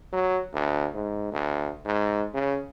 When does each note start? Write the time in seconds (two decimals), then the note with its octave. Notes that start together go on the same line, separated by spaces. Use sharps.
0.13 F#3
0.54 D2
0.94 G#2
1.33 D2
1.85 G#2
2.34 C#3